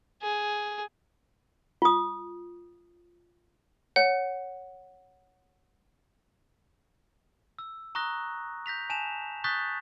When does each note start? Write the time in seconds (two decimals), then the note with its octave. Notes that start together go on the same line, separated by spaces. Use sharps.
0.22 G#4
1.82 F4 D#6
3.96 C#5 F#5
7.58 E6
7.95 A#5 C#6 D#6 F#6 A#6
8.66 G6 A#6 B6 F7
8.90 G#5 A5 E7 F7
9.44 C#6 D#6 F#6 G6 A6 B6